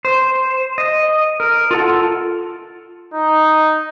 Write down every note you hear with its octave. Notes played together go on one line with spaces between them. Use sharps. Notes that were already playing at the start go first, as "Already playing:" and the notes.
C5
D#5
A#4
F4 A4 F#5
D#4